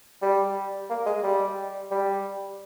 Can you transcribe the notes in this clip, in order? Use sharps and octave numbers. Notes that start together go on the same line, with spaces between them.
G3
A#3
G#3
G3
G3